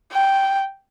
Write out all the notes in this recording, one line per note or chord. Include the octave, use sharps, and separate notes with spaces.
G5